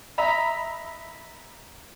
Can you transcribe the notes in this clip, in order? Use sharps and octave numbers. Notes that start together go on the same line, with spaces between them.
D#5 E5 A#5 B5